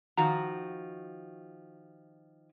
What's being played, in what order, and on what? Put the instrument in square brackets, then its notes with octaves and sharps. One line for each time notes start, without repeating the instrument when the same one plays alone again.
[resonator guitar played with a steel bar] D#3 F3 F#4 [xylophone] A#5